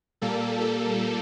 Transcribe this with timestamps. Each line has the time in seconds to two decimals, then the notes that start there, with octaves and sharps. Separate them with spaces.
0.21 A#2 G3 A#3 A4
0.61 A4